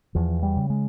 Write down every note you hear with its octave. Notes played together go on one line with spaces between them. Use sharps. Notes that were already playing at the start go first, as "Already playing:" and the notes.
E2 F3
G3
C#3
G#3